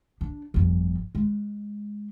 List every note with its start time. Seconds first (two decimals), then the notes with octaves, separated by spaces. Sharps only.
0.21 D4
0.54 G1 F2
1.15 G#3